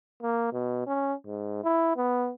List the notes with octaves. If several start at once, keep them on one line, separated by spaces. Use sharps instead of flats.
A#3
B2
C#4
G#2
E4
B3